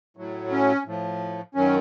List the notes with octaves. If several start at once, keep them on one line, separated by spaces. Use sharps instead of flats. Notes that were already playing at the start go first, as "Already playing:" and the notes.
A2 F#3
C#4
A2 F3
F#2 D#3 F#3 C#4